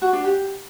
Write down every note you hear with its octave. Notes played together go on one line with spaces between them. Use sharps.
F#4
D4
G4